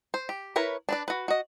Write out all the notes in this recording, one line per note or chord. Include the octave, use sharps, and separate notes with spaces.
C5
G4
E4 A#4 B4 C#5
D4 B4 D5
F#4 B4
F#4 D#5